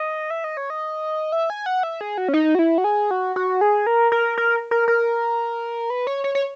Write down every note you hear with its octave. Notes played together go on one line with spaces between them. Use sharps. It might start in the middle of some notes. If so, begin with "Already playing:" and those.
Already playing: D#5
E5
D#5
C#5
D#5
E5
G#5
F#5
E5
G#4
F#4
C#4
D#4
F#4
E4
F#4
G#4
F#4
F#4
G#4
A#4
A#4
A#4
A#4
A#4
B4
C#5
C#5
C#5